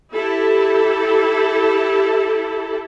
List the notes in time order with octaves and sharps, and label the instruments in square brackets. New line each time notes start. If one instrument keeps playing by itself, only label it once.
[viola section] E4 G4 A4